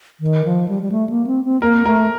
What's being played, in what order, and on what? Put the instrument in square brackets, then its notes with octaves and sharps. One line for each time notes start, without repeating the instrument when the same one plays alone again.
[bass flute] D#3
F3
G3
G3
A3
A#3
C4
C4
[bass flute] A#3 [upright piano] A#4
[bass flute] A3 [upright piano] A#4